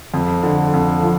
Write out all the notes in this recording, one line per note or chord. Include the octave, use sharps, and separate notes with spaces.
F2
D3
F2
F3